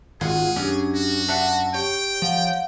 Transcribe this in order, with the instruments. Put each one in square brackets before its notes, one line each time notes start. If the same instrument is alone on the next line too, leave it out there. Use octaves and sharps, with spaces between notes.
[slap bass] G#1 [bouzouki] F4 F#5 [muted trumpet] G#4
[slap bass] F#2 [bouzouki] C#4 [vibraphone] D4 G4
[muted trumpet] F#4
[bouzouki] D4 E5 F#5 [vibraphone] A5
[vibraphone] G4 [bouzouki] C#5 [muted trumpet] G5
[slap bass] F3 [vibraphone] F5 F#5